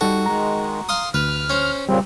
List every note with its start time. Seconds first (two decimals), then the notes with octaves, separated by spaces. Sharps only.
0.01 G3 D#4 F#4 A4
0.26 D#3 G#3 A#5
0.89 F5 C6 D#6
1.14 D2 B4 F6
1.50 C#4 C5
1.89 A#2 C#3 G3 C4